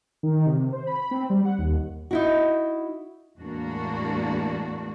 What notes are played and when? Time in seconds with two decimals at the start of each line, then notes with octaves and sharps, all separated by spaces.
0.23 D#3
0.46 C3
0.73 C5
0.87 B5
1.11 C4
1.30 G3
1.45 F#5
1.58 D#2
2.11 D#4 E4 F#4
3.38 E2 A2 G#3 A#3 D4 F#4